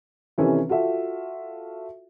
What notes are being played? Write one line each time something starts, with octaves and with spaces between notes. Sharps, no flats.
C3 D#3 E3 C#4 D#4 A4
F4 F#4 A4 E5